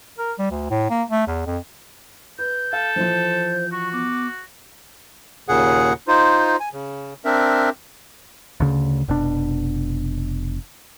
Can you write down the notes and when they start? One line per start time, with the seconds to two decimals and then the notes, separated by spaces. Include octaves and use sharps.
0.18 A#4
0.39 G3
0.51 D2
0.70 A2
0.90 A#3
1.10 A3
1.27 E2
1.46 F2
2.39 B4 G6
2.73 A4 F5
2.96 E3 F3 C5
3.72 F#4 C#6
3.93 B3 D6
5.49 D#2 A#2 C#3 G#4 F#5
6.08 D#4 F4 C5
6.60 G#5
6.73 C#3
7.25 C4 D4 A#4 E5
8.60 D2 C#3
9.08 F1 B2 D4